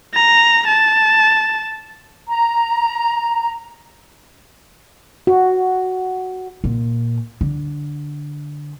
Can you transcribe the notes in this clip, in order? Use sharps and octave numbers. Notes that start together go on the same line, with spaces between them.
A#5
A5
A#5
F#4
A#2
D3